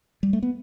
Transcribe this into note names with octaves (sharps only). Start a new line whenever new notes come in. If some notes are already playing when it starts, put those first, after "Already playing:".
G3
A3
B3